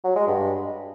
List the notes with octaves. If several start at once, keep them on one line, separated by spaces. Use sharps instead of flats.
F#3
G#3
G2